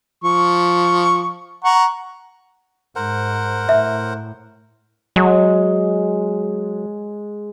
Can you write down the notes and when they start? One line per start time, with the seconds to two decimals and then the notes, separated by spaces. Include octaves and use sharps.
0.24 F3 C#6
1.64 F#5 A#5 C#6
2.96 G#2 A#4 C5 F#5
3.69 A2 E5
5.16 F#3 G#3